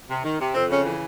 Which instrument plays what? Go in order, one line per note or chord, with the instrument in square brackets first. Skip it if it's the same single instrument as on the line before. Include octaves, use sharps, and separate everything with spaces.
[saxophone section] C3
D#3
C3
F2 C4
C#3 C#4
E3